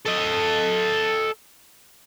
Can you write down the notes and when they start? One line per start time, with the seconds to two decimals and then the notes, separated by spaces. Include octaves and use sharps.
0.05 A4 D#5